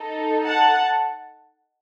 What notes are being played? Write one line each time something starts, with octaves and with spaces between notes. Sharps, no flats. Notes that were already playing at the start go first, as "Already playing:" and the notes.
Already playing: D#4 A4
F#5 A5